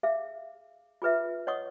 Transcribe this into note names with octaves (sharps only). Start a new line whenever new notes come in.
G#4 E5 F5
F4 G#4 B4 E5
C#5 D#5 F#5 C#6 D#6